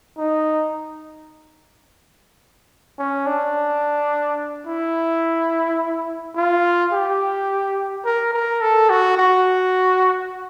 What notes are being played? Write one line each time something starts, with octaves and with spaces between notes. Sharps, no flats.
D#4
C#4
D4
E4
F4
G4
A#4
A#4
A4
F#4
F#4